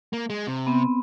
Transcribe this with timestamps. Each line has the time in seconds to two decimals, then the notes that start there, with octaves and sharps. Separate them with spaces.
0.13 A#3
0.30 G#3
0.47 C3
0.67 B3 C4